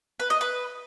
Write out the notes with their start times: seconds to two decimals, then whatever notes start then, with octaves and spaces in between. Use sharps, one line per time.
0.20 B4
0.30 D#5
0.41 B4